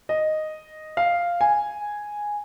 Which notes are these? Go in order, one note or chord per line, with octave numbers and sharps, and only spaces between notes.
D#5
F5
G#5